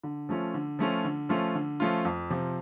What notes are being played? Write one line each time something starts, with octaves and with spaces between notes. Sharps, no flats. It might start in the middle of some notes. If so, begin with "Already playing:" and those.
D3
F3 A3 C#4 F4
D3
F3 A3 C#4 F4
D3
F3 A3 C#4 F4
D3
F3 A3 C#4 F4
F2
C3 F3